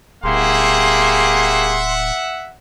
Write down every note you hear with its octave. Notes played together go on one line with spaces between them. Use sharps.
D1 A#3 G4 G#4 E5 F#5 C6